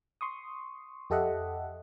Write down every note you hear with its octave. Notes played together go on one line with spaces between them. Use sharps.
C6 C#6 D#6
F2 G4 A4 D#5 E5 F#5